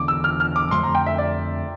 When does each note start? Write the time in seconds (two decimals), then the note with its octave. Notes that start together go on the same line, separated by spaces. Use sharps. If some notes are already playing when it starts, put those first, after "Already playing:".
Already playing: E1 E2 D3 D6
0.08 E6
0.24 F6
0.40 F6
0.56 D6
0.71 F2 D3 A3 C6
0.83 A#5
0.95 G5
1.06 E5
1.18 D5